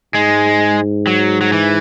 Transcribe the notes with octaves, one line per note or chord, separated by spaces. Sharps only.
G#2 G#3
F#3
F#3
E3